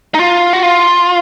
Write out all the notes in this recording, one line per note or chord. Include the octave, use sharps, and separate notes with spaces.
D#4
F4
F#4
F4